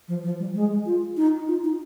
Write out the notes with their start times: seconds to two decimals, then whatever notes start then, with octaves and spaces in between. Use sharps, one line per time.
0.08 F3
0.24 F3
0.40 G3
0.55 G#3
0.86 F4
1.17 D#4
1.48 F4
1.64 D#4